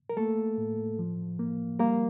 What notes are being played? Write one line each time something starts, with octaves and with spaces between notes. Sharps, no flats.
A#4
A3 A#3 A4
A2
F3
A#3
G3 A#3 A#4